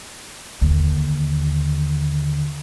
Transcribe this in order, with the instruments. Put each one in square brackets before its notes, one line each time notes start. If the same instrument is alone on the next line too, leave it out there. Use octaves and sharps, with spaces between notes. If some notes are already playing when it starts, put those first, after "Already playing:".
[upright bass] D#2 [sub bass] D3